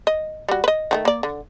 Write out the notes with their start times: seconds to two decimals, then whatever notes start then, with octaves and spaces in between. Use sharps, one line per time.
0.07 D#5
0.48 G3 F#4
0.64 B4 D#5
0.91 D#3 F#3 A3
1.05 A#3 D5
1.23 D3